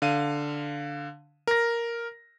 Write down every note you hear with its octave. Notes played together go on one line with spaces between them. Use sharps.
D3 F5 D#7
A#4 A#6